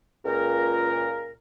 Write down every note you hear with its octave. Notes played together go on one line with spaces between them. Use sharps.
C#2 A#2 A#4